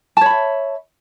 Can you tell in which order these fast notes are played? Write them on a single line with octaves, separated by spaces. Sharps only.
A5 C#5 B5 E5